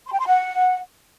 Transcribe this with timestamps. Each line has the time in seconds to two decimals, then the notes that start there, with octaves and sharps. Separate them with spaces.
0.07 C6
0.13 G5
0.20 C6
0.26 F#5